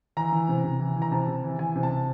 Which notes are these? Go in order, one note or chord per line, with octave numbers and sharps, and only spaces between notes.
E3 A#5
E3
C3
C3
E3
E3
A#5
C3 A5
C3
E3
E3 G#5
C3
A5
C3